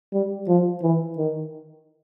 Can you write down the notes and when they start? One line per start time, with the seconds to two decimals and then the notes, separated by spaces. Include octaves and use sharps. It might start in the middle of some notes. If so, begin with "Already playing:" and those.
0.13 G3
0.48 F3
0.83 E3
1.18 D#3